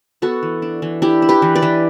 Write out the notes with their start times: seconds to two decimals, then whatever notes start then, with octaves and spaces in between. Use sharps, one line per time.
0.22 B3 F#4 A4
0.43 E3
0.62 D4
0.82 E3
1.02 D4 E4 G4
1.22 D4
1.29 G4 B4
1.42 E3
1.55 B4 D5
1.62 E3